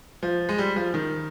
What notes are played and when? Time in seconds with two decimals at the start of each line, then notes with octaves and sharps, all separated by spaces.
0.23 F3
0.49 G#3
0.58 G3
0.76 F3
0.94 D#3